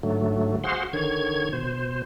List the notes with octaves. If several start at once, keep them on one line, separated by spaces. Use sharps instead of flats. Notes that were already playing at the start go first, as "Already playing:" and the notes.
G#2 D3 F#3 A3
F#4 G#4 C5 F5 F#5 C6
D3 D#3 C#5 G#6
B2 C5